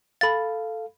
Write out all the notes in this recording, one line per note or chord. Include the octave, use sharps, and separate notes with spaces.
A4 F5 B5 A6